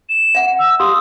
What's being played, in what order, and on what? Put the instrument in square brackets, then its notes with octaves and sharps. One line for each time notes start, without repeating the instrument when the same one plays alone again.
[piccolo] E7
[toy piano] E5 F#5
[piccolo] E6
[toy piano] G4 F5 C6 [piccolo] D#6